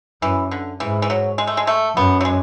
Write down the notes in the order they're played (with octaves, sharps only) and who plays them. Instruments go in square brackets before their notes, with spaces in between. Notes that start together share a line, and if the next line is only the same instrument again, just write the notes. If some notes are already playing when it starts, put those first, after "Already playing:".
[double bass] F#2 [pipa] E3
[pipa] D3
[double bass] G#2 [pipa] E3
[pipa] E3
F#3
G#3
A3
G#3
A3
[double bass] F#2 [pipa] B3
[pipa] F#3
G#3